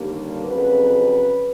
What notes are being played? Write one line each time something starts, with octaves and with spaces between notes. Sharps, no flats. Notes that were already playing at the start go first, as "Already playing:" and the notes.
Already playing: D#2 D3 G3 A#3
F2 C#3 F#3 B4